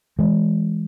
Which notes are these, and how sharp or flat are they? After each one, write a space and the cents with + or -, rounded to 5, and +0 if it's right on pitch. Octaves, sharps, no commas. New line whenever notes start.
E3 -5 G#3 +0